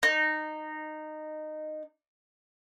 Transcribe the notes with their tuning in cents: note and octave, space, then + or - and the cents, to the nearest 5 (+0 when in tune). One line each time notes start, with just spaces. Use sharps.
D#4 -15